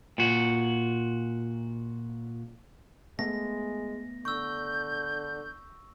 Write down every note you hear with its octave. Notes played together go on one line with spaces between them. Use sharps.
A#2 F#4
G#3 A3 B3 A#6
D3 C#6 E6 G6